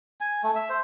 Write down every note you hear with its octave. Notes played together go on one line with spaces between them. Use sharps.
G#5
A3
E5
C5